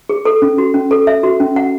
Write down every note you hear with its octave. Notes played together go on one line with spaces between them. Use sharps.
G#4
A4
C#4
F#4
C#4
A4
E5
F#4
C#4
F#5